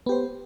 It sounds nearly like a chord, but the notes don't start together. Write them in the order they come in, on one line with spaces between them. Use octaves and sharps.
B3 G4 C5